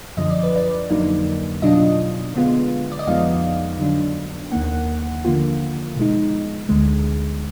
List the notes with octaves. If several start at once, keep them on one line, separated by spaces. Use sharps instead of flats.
F#2 D3 F3 D#5
D5
B4
D5
F2 D3 F#3 A#3 D#4
B2 F#3 D4 F4 D#5
D3 G#3 B3 F4
D5
D#5
F2 F3 G#3 B3 D#4 F5
D3 F#3 D4
D#2 D#3 A#3 F#5
D3 F3 A#3 F4
B2 G#3 D#4
D2 D3 G#3